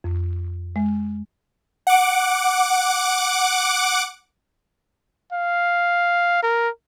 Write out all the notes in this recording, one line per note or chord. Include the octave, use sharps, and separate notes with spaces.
F2
G#3
F#5 D6
F5
A#4